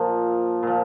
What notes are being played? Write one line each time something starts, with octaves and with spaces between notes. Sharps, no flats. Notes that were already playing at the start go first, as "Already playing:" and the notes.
Already playing: A#2 F3
A#2 F3